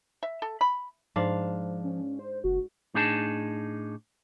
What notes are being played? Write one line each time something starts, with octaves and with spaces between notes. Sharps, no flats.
E5
A4
B5
G#2 F3 D4 F5
C#4
C5
F#1 F#4
A2 D4 D#4 G#4 B4 A5